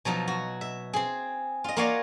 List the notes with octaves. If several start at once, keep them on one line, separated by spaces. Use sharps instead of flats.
B2 F3 F#3 D#4
F#4
E5
C4 G#4
F4 D#5
A#3 F4 F#4 C#5 D5 F5